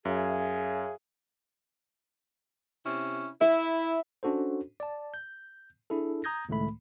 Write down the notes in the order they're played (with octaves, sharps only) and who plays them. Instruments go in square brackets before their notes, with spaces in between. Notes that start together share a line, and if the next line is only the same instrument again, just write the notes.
[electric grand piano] F#2 [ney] G#4 [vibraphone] C#5 E5 F5
[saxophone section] C3 C#4 E4
[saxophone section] E4 [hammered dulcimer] E5
[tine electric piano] C#4 D4 F#4 A4 C5
D5 A5
G6
D4 E4 G#4 A4
A#5 D#6 G6 G#6 A#6
C#2 A2 D#3 G#3 A3 B5